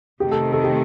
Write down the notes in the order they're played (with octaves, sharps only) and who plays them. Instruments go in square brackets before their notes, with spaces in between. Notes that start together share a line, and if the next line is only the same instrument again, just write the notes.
[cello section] C3 D#3 A3 [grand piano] G4
[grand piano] A4
A4
G4